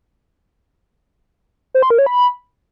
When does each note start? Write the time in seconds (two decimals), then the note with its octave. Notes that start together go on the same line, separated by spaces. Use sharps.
1.74 C5
1.82 C6
1.90 A#4
1.98 C#5
2.06 B5